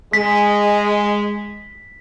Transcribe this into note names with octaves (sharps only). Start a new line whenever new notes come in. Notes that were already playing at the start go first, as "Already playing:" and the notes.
G#3 B6